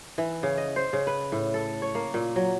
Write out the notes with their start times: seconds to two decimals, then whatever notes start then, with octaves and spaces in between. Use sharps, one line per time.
0.18 E3
0.43 C#3
0.57 D#5
0.76 C5
0.93 C#3
1.07 B4
1.32 A2
1.54 A4
1.82 C#5
1.95 A#3
2.14 A#2
2.36 F#3